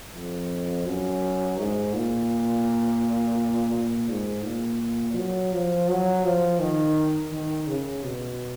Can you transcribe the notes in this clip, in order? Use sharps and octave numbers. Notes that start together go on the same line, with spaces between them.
F2
F#2
G#2
A#2
A#2
G#2
A#2
F#3
F3
F#3
F3
D#3
D#3
C#3
B2